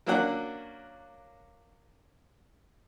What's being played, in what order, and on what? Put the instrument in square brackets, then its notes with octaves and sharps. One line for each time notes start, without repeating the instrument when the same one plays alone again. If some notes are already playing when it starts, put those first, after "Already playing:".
[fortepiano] F#3 A#3 C#4 D4 F#5